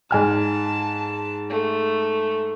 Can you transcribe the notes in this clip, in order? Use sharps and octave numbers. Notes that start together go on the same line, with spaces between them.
G#2 G#5 A5 F6
A3